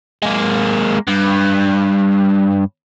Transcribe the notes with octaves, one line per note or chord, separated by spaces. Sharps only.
G#3 A#3
G2